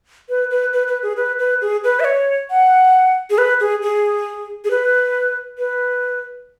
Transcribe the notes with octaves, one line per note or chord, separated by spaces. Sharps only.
B4
B4
B4
B4
G#4
B4
B4
G#4
B4
E5
C#5
F#5
G#4
B4
G#4
G#4
G#4
B4
B4